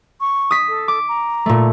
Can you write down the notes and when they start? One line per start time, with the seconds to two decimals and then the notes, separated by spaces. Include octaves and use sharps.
0.21 C#6
0.51 D#6 B6
0.68 A4
0.88 D6
1.08 A#5
1.46 A#2 A3